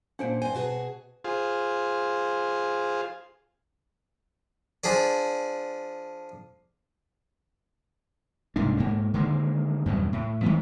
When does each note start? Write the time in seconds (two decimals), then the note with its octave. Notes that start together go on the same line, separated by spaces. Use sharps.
0.19 A#2 C#4 D4 C5 F#5 D7
0.42 G2 C4 C5 G#5
0.55 B2 F#4 G#4
1.24 F4 G#4 C5
4.84 F3 D4 G#4 D5
8.56 C2 G#2 A#3 D4
8.78 G#2 A#3
9.14 D3 D#3 G#3 A#3
9.86 E2 G2 B2 F#3
10.13 A2
10.43 D#3 F3 G#3 B3